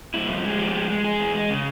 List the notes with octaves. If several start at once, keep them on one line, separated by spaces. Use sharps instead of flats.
G2 E4
F3
G#3
F3 G4
G#3
G#3
G#3 G#4
E2
G#3
C#3